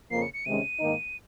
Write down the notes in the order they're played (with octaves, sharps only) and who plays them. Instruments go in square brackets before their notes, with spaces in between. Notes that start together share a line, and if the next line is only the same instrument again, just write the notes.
[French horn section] F2 C#3 F3 A#3 [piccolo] C7
[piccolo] C#7
C#7
[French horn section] C3 D#3 G#3 C#4 [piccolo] D#7
[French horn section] G#2 D#3 A#3 D#4